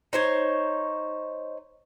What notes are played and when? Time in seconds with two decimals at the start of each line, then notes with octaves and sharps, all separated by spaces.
0.13 D#4 C5 C#5